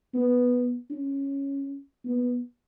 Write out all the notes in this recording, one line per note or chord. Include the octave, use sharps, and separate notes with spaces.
B3
C#4
B3